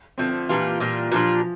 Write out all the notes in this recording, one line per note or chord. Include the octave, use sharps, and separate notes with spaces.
D3 F3 A3 C4
C4
A#2 E3 G3 D4 F4
A#2 G3 D4 F4
A#2 F3 G3 D4 F4